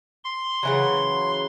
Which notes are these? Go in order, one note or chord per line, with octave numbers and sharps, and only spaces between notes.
C6
C#3 E3 F#3